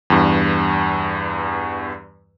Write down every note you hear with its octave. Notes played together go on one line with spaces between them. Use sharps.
E2 G2